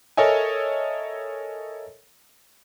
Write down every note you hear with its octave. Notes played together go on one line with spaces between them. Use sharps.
A4 A#4 C#5 D#5 E5 G#5